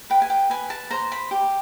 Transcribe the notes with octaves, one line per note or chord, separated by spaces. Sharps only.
B4 G5
G#5
G5
B4 G#5
A5
C5 A#5
B5
G4